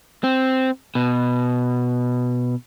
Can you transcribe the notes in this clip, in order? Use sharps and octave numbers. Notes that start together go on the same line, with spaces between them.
C4
B2